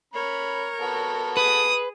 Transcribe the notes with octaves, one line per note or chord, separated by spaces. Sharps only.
C#4 A#4 C#5 B5
B3 F#4 A4
G#4 B4 D#6